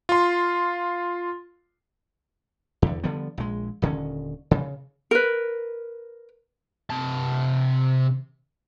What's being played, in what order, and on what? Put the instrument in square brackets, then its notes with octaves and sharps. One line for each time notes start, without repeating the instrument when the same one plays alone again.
[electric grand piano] F4 C6
[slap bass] E2 D3
D3 F3 G3 B3
A#1 G#3
D#1 D3 D#3 C#4
C#3
[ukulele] A#4 B4
[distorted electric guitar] C3 A5